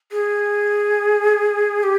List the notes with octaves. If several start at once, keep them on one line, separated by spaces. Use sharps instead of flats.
G#4
G4